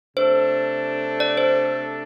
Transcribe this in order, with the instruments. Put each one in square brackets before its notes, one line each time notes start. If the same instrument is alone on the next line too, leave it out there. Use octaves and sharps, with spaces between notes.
[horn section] C3 A3 D4 A4 [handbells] C5
[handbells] D5
C5